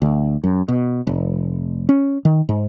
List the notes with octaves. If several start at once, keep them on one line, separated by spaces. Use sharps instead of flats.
D2
F#2
B2
F1
C#4
D#3
G#2